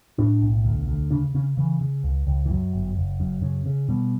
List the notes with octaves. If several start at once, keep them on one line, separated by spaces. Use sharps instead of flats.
A2 D4
B1
D2
D2
C#3 D4
C#3 C#4
C#3 E3
C#3
C#2
C#2
E3
F#2 F#3
G1
F#1
F#2
C#3
C#3
B2 G3